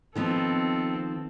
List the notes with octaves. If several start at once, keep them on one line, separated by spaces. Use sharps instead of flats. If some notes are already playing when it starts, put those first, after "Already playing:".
D#3 F3 B3 C4 A4